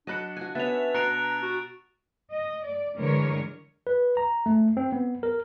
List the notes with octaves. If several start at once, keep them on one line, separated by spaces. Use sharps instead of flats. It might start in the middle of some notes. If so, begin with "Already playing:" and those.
F#3 D4 D#5 A5 B5 F#6 C#7
F#4 G#5
B3 C#4 E5 A6 F7
B2 A#5 C6 F#6 C#7 D7 F7
F#4
D#5
D5
D3 E3 G#3 A#4 C#5
B4
A#5
A3
C4
B3
A#4